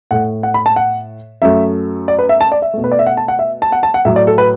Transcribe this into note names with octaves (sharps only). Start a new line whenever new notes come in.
A2 A3 F#5
F#5
B5
A5
F#5
F#2 F#3 A3 E5
D5
B4
E5
A5
D5
E5
B2 A3
B4
D5
E5
F#5
A5
F#5
E5
A5
F#5
A5
F#5
A2 F#3 A3 E5
D5
A4
B4